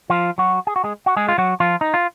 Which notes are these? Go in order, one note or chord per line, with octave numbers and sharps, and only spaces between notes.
F3 F4
F#3 F#4
G#4
F#4
G#3 G#4
F#4
G#3 G#4
F4
F#3 F#4
F3 F4
D#4
F4